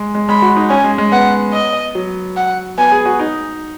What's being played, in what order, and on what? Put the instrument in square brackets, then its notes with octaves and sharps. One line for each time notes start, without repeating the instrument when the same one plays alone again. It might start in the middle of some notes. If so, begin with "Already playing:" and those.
Already playing: [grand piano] G#3
G#3
[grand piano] G#3 [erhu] B5
[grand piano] F#4
D#4
[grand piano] C#4 [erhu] G#5
[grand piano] G#3
G#3
[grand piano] B3 [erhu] F#5
[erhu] D#5
[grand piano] F#3
[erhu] F#5
[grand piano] B3 [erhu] G#5
[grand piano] G#4
F#4
D#4